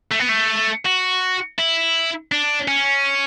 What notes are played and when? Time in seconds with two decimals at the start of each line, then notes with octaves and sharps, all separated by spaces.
0.12 A3
0.20 B3
0.29 A3
0.85 F#4
1.58 E4
2.32 D4
2.68 C#4